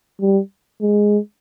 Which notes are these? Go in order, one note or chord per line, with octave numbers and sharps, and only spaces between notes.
G3
G#3